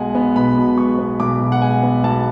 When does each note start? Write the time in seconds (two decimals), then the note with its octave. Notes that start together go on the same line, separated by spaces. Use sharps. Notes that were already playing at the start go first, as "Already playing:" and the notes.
Already playing: B1 B2 G#3 F#5 G#5
0.15 B3
0.36 B1 B5
0.57 B2
0.78 G#3 C#6
0.99 B3
1.20 B1 D6
1.40 B2
1.52 F#5
1.62 G#3 G#5
1.83 B3
2.04 B1 A5